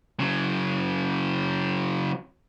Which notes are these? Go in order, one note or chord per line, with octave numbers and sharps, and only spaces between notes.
C#3 F#3